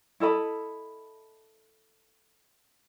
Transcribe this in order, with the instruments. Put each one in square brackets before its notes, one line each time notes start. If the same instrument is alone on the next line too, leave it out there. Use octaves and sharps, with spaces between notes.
[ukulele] E4 A4 D#5 B5